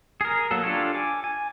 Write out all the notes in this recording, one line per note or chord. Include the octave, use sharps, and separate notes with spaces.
G#4 A#4
F#3 A#3 A4
D4 F4 G4 A4 C#5
G#5 D6
G#5